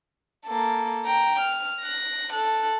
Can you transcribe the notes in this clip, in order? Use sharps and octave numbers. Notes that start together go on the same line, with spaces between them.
A#3 A4
G5 A#5
F6
F#6 A#6
A4 F#6